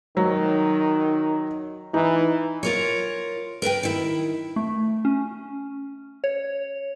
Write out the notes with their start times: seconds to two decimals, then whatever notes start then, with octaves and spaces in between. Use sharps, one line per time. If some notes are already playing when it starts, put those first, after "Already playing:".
0.17 D#3 F#3
1.94 E3 D#4
2.63 F4 A#4 C#5
3.62 A#4 B4 E5 G5
3.83 D#3 E4
4.56 A3
5.05 C#4
6.24 C#5